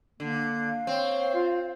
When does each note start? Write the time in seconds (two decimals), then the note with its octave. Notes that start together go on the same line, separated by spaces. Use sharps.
0.20 D3 A#3
0.68 F5
0.87 C4 C#5
1.34 F4